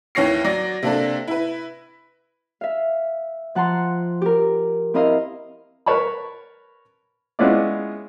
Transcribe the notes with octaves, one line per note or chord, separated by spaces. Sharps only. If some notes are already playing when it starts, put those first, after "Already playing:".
D#2 E3 C#5 A#6 C7
F#3 D5 A#6
C3 A#3 D4 A4
E4 B4
E5 F5
F3 F#5 A5 A#5 C6
G4 A#4
C4 E4 A#4 D#5 F5
A#4 B4 C#5 A5 B5
G#3 B3 C#4 E4 F4 D5